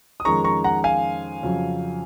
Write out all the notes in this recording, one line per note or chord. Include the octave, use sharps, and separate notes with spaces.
D#6
F2 D#3 G#3 C#4 A#5 C#6
A#5 C#6
F#5 A#5
F5 G#5
F2 C#3 F#3